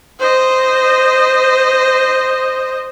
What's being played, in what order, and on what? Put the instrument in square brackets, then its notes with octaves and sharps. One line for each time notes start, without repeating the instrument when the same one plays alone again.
[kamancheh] C5 D#5